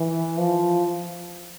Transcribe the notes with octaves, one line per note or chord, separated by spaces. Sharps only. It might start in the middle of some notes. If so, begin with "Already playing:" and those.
Already playing: E3
F3